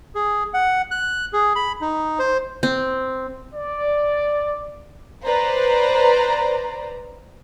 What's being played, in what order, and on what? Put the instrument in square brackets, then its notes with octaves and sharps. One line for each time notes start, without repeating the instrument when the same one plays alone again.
[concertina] G#4
F#5
F#6
G#4
B5
D#4
C5
[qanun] C4
[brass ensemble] D5
[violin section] B4 C5 D5 A#5